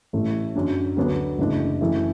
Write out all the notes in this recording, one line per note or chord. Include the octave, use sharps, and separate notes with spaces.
A1 A2 A3
F#2 F#3 D4
D2 D3 F#3 B3 D4
F#1 F#2 E3 A3 D4
F#2 E3 A3